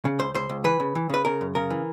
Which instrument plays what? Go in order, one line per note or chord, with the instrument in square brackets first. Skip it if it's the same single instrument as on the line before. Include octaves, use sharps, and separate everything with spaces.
[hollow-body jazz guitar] C#3
C#2 C5
C#2 C5
C#2
E3 B4
C#3
E3
C#3 B4
C#3 A#4
F#2
C#3 A#4
E3